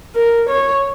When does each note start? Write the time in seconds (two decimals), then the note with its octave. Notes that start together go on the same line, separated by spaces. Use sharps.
0.16 A#4
0.49 C#5